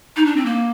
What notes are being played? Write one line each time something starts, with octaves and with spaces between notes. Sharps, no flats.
D#4
D4
C4
A#3